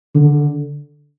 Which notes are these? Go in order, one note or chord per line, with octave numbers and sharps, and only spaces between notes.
D3